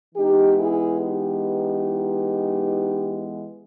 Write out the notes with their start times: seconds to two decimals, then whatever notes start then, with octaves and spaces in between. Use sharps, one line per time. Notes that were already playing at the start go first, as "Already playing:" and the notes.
0.15 E3 G#3 B3 D#4 G4
0.57 E4 G#4
0.99 D#4 G4